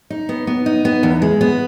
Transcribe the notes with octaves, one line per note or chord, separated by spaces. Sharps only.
D#4
B3
B3
D#4
B3
E2
G#3
B3